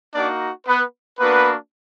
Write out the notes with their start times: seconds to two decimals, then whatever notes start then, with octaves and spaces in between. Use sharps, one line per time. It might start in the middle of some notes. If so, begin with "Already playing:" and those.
0.14 A#3 D4 D#4 F#4 D5
0.67 B3 B4
1.19 A#3 B3 D4 F#4 B4